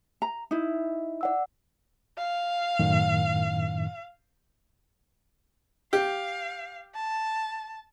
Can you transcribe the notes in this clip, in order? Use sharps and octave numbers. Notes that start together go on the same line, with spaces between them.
A#5
D#4 E4
D5 F#5 E6
F5
F#2 A2 D#3
G4 F5
A5